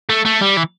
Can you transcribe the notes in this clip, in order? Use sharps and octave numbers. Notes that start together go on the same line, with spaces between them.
A3
A3
G3
E3